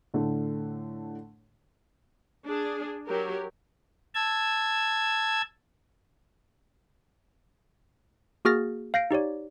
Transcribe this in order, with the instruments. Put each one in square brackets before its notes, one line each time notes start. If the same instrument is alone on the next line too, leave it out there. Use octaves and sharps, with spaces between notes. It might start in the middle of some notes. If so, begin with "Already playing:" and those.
[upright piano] A2 D3 A3
[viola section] D4 G#4
F#3 G4 A#4
[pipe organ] A5 E6 G#6
[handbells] A#3 F#4 G#4 F6 A6 A#6
F5 G6 A#6 C7 D7
D#4 G4 C#5 D5